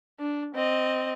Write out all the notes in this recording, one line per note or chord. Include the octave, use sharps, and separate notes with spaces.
D4
C4 D#5